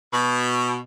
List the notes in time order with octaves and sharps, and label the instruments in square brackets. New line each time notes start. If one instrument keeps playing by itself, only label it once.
[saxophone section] B2